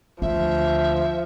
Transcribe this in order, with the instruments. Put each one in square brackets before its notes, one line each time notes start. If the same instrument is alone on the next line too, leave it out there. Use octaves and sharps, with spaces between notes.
[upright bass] D2 [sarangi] F3 [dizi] E5